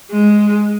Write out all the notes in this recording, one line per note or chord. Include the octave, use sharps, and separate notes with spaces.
G#3